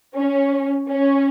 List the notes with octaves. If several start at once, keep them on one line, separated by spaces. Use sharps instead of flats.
C#4
C#4